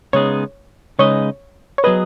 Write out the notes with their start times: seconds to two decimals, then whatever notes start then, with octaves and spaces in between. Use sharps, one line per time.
0.13 C#3 G#3 B3 D#4 G#4 C#5
0.99 C#3 G#3 D#4 B4 C#5 D#5
1.78 C#5
1.84 F#3 B3 G#4 B4 D#5